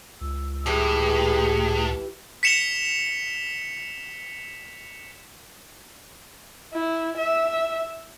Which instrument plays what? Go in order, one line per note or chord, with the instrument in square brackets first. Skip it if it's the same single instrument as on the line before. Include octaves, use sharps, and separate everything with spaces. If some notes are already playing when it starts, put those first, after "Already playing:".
[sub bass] C#2 [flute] E6
[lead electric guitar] A2 [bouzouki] E3 G4 [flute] G#4
[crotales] B6 C#7 E7 F7 G7
[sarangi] E4
E5